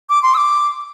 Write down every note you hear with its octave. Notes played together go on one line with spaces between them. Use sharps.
D6
C6
E6
D6